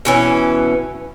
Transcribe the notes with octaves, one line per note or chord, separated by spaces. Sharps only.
B2 E3 C#4